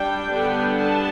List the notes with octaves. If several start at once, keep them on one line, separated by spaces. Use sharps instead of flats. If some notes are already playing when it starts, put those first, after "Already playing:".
Already playing: G3 D4 G5
D3 G3 B3 D4
A5